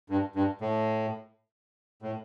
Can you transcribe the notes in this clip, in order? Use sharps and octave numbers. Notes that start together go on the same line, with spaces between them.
G2
G2
A2
A2